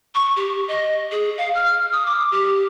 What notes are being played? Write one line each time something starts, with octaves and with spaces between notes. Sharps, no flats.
C#6
G4
D#5
G#4
F5
F6
D#6
D6
G4